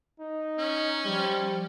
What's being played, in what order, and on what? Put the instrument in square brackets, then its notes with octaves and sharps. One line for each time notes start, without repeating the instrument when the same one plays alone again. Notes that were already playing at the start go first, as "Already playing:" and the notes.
[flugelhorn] D#4
[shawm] C#4
[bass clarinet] F3 [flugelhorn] G3